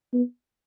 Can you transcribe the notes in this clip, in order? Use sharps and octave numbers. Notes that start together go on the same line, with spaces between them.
B3